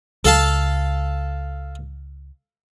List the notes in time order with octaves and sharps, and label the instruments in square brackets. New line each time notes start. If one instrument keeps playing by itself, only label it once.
[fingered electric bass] C#2 [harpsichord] A4 F5 A5